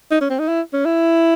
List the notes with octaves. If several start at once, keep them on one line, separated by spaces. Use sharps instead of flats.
D#4
C#4
C4
D#4
E4
C#4
E4